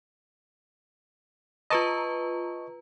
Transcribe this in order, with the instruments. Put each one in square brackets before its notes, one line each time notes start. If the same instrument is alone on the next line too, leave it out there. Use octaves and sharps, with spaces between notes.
[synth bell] F4 B4 A#5 [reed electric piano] D#5 A5 C#6